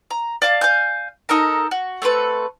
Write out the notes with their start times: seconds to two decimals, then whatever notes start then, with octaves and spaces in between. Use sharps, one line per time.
0.10 A#5
0.42 D5 F5 A5
0.61 F5 G#5 G6
1.29 D#4 A4 A#4 A#5
1.71 F#4
2.02 A3 C4 A4 B4